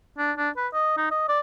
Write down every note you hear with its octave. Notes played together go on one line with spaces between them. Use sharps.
D4
D4
B4
D#5
D#4
D#5
D5